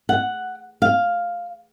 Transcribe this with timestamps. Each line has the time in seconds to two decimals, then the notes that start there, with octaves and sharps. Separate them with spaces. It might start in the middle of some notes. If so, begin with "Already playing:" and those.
0.09 F#5
0.82 F5